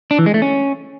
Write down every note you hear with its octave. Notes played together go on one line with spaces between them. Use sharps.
D4
E3
G#3
A3
C#4